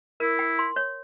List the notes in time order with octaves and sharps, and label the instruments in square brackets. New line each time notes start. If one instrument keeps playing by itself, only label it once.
[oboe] E4 [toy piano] A#4
[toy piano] G5
C6
C#5